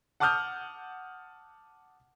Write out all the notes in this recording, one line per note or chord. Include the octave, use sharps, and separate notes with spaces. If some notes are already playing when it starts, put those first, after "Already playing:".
F#5 A5 D6 D#6 F6 G6